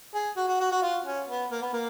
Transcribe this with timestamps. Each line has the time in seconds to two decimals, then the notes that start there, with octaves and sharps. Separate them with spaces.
0.14 G#4
0.37 F#4
0.48 F#4
0.60 F#4
0.72 F#4
0.82 F4
1.06 C#4
1.29 B3
1.52 A#3
1.62 B3
1.74 A#3